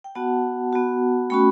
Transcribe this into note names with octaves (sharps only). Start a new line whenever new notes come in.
G5
B3 F#4 F#5 A5
B3 F#4
A3 C#4 F#4 G5 B5